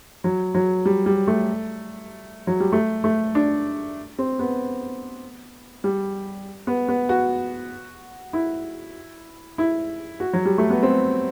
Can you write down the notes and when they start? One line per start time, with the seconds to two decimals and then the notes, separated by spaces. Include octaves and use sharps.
0.24 F#3
0.54 F#3
0.86 G3
1.06 G3
1.27 A3
2.47 F#3
2.60 G3
2.72 A3
3.04 A3
3.35 D4
4.19 C4
4.39 B3
5.84 G3
6.67 B3
6.89 B3
7.09 F#4
8.33 E4
9.58 E4
10.20 F#4
10.33 F#3
10.45 G3
10.58 A3
10.70 B3
10.83 C4